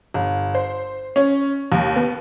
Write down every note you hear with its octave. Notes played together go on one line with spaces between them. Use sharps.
G1
C5
C#4
D#2
B3